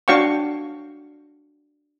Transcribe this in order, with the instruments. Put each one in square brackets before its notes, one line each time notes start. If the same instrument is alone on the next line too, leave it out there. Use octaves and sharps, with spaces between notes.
[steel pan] D4 F#4 C#5 F5 G5 C#6